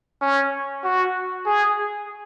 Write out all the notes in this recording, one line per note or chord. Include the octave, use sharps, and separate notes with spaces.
C#4
F#4
G#4